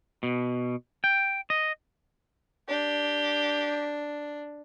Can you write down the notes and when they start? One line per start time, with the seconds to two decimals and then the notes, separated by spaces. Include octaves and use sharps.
0.23 B2
1.04 G5
1.50 D#5
2.69 D4 G4